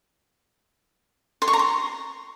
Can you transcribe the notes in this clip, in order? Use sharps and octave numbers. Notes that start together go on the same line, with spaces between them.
C6
C#6
A#5
C6